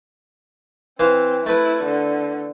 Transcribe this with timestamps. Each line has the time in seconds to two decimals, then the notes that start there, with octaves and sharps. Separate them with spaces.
1.00 E3 C4 C5 F5
1.46 A3 E4 B4
1.84 D3